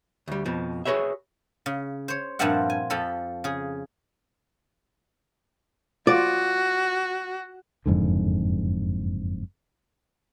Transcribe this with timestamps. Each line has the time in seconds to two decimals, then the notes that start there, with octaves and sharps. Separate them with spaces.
0.28 D2 G3
0.45 F2 B2 F3
0.85 F#4 G#4 B4 C#5 E5
1.66 C#3
2.08 C5 C#5
2.39 G2 A#2 F3 C4 E5 F#5
2.70 G#5
2.90 F2 F3 A4 B5
3.44 C#3 G#4
6.07 F4 F#4 D5
7.86 F#1 F2 G#2 D3